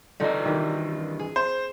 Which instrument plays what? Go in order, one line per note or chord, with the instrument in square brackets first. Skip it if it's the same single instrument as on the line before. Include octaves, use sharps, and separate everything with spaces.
[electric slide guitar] G2 E3 D#5 [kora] D3 C4 D#4
[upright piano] D#3 [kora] E4 G4
[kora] G#4
[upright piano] C5